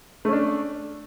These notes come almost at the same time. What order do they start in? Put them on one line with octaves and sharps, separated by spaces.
A3 C#4 D4